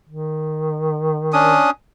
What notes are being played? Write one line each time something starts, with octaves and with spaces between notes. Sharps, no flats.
D#3
C#4 D4 D#6